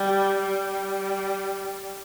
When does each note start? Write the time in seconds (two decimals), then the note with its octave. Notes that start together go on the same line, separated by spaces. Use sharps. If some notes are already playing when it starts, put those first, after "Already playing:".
Already playing: G3
0.39 G3